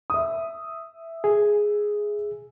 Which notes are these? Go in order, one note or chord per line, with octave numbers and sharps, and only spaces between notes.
E5 D#6
G#4